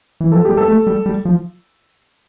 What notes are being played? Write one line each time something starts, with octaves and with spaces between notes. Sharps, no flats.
E3
F3 A4
G3 G4
A4
A3
G3
G3
F3